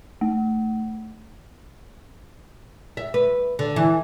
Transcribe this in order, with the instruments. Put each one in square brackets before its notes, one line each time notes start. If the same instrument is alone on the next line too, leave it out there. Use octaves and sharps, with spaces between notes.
[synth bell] A3
[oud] E5
B4
D3
E3